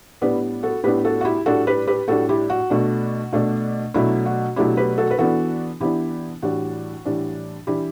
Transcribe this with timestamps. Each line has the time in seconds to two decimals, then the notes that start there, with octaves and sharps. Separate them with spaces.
0.22 A2 G3 B3 D4 B4 D5
0.63 F#4 A4
0.84 A2 G3 B3 D4 G4 B4
1.05 F#4 A4
1.21 F#4
1.25 E4 G4
1.46 A2 G3 D4 F#4 A4
1.67 G4 B4
1.87 G4 B4
2.08 A2 G3 D4 F#4 A4
2.29 E4 G4
2.50 F#4
2.70 B2 A3 D4
3.33 B2 A3 D4
3.94 B2 F#3 A3 D4 E4
4.26 F#4
4.56 B2 F#3 A3 D4 E4 G4
4.77 G4 B4
4.98 F#4 A4
5.11 B4
5.18 E3 B3 D4 F#4 A4
5.80 E3 B3 D4 E4 G4
6.42 A2 E3 G3 D4 F#4
7.06 A2 E3 G3 D4
7.67 E3 G3 D4 E4 G4